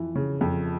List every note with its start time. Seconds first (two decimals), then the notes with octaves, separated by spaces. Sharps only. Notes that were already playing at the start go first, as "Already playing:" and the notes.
Already playing: F2 E3
0.16 C#3
0.41 F2